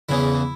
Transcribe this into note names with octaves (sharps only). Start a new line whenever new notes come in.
E2 C#3 E3 E4